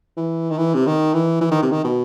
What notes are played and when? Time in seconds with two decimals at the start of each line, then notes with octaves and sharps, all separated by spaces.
0.17 E3
0.51 D#3
0.58 E3
0.74 C3
0.86 D#3
1.13 E3
1.41 E3
1.51 D#3
1.62 C3
1.71 D#3
1.84 B2